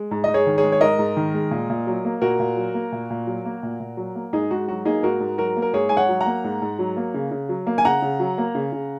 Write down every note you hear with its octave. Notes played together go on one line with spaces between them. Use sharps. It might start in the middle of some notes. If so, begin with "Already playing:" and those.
Already playing: G#3
G#2
G#2 D#5
G#4 C#5
D#3
G#4 C#5
G#3
C#5
G#2 A#4 D#5
G#2
D#3
G#3
A#2
A#2
F#3
A#3
A#2 F#4 A#4
A#2
F#3
A#3
A#2
A#2
F#3
A#3
A#2
A#2
F#3
A#3
G#2 D#4 G#4
G#2 F#4
F#3 F#4
A#3 D#4 G#4
G#2 F#4 A#4
G#2
F#3 F#4 A#4
A#3
A#4
G#2 G#4 C#5
G#2 G#5
C#5 F#5
F#3
F#5 A#5
A#3
G#2
G#2
F#3
A#3
C#3
C#3
F#3
A#3
G#5
C#3 F#5 A#5
C#3
F#3
A#3
C#3
C#3